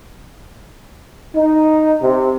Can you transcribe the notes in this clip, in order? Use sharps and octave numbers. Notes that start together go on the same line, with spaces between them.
D#4
C3